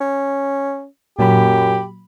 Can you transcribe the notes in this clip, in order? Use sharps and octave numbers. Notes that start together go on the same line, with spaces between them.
C#4
F#2 A#2 F#3 G4 B5